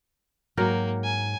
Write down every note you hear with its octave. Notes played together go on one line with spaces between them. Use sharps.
G#2 F#3 A#3 A#4 G5
G#5